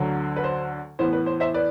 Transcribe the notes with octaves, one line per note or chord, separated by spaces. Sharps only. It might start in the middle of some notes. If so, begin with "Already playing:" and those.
Already playing: D2 D3 F#3
B4
C5
A2 E3 B3 C5
B4
C5
C5 E5
B4 D5